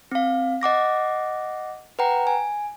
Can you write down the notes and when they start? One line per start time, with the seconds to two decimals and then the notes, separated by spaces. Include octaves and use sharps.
0.12 C4 F5
0.61 D#5 F#5 D6 A#6
1.99 B4 F#5 G5 A#5
2.27 G#5